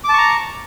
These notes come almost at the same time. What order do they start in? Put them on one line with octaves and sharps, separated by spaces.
D6 A5 C#6 A#5